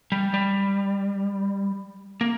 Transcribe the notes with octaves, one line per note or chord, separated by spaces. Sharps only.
G3
G3
A#3